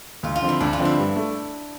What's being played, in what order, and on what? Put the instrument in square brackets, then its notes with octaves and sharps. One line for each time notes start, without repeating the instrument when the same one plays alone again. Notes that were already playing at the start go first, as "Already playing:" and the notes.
[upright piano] D2 [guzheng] F4
[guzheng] F4
[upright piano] D3 F3 C4
[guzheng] E4
[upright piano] D2 [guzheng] D4
[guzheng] F4
[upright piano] D3 F3 C4
[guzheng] E4
[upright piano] G2
A3